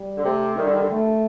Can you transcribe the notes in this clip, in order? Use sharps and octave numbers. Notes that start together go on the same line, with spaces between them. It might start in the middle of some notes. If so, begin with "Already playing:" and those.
Already playing: G3
D3
C3 A3
D#3 G3
D3
D#3
D3
A3